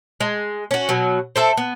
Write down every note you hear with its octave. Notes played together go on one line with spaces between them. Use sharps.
G#3
C#4 F#4
B2 F#3
C4 A4 E5
B3